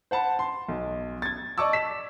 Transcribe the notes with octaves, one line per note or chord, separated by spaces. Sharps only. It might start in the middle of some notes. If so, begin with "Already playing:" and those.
C5 F#5 A5 B5
C6
B1
G#6 A6
D5 D#5 A5 C#6 D6 E6
B6 E7